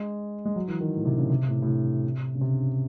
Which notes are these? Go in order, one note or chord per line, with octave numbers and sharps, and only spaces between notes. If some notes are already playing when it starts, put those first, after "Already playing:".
Already playing: G#3
G#3
F#3
E3
D#3
A2
C3
C#3
C3
A2
A2
C3
C#3
C3